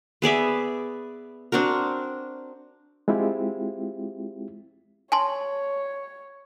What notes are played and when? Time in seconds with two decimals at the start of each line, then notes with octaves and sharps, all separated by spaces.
0.22 B3 G#4 D5 E5
1.52 C4 D4 F#4 A#4
3.08 G#3 C4 E4 F4 G4
5.12 C#5 G#5 A5 C6